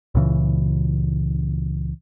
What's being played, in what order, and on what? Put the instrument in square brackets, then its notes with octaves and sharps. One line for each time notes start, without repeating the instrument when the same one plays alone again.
[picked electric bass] C#2 A#2 C#3 E3